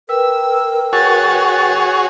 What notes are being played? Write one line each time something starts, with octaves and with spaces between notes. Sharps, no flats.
A#4 B4 G5 E6
F#4 G#4 C#5 A6